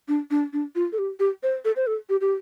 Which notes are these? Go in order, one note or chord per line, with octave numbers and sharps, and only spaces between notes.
D4
D4
D4
F4
A4
G4
G4
C5
A4
C5
A4
G4
G4